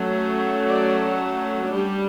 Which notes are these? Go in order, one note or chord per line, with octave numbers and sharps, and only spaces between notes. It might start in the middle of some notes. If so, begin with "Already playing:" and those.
Already playing: F#3 A3 C#4
D5
G3 D4 G4